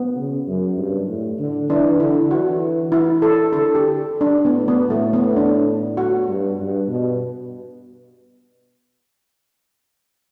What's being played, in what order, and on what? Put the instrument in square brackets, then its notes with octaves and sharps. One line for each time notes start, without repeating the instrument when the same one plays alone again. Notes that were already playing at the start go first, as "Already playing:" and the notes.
Already playing: [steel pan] B3
[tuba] C#3
F#2
G2
A2
D3
[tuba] E3 [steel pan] D4
[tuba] D3 [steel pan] E4
[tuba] E3 [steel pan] F#4
[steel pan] E4
A4
[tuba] D3 [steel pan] A4
[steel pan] G4
D4
[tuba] A2 [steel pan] B3
[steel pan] B3
[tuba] A2 [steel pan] A3
[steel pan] B3
D4
F#4
[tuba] G2
G2
B2